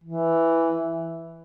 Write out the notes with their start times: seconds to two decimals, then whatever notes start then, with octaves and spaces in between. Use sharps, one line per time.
0.04 E3